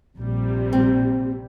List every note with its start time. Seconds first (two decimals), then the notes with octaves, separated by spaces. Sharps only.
0.17 A#1 C3 G3
0.73 C4